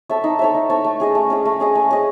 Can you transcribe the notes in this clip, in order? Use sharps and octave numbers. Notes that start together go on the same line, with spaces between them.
A4 C#5 E5
D#4
A4 C#5 E5
D#4
A4 C#5 E5
A3
C#4 G#4 D#5
A3
C#4 G#4 D#5
A3
C#4 G#4 D#5
A3
C#4 G#4 D#5